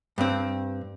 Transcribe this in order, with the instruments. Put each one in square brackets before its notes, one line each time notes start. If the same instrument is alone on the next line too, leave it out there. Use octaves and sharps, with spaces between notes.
[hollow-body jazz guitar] G2 C4